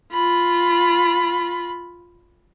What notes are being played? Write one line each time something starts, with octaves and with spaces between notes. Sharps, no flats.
F4 B5